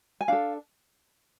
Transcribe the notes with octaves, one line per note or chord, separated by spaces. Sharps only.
G#5
D4 A4 F5